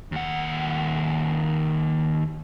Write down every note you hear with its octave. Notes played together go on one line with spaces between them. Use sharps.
D#2 F#5